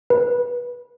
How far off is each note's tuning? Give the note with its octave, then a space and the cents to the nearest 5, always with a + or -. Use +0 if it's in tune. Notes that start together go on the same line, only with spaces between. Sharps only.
B4 -20